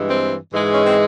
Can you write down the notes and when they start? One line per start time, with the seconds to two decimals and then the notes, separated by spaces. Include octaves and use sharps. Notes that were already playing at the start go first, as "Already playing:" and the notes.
Already playing: G2 E3 G#3
0.10 C4
0.52 G#2 E3 G#3
0.74 C#4
0.84 C4